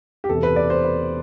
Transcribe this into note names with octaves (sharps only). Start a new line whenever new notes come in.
G4
E1 E2 C3 A4
B4
D5
C5
B4